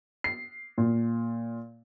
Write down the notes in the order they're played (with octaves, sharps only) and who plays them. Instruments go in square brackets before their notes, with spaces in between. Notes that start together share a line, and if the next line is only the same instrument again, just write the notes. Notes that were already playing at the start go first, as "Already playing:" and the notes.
[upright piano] C7
A#2